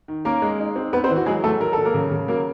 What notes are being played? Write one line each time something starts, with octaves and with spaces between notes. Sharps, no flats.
D#3
A#3 C#4 A#4
G#3
D#4
C4
B3 C4 B4
C4 C5
E3
F#4
F#3 G#3 G#4
F#3 A3 A4
F#3 A#4
F#3 A4
A#3 A#4
C#3
C#3
F#3 A#3 A#4